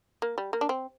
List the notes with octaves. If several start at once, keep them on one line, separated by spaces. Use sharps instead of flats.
A#3
G3
A#3
D4
C4